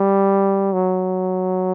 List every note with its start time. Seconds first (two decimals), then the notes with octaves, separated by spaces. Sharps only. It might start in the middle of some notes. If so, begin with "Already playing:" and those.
Already playing: G3
0.73 F#3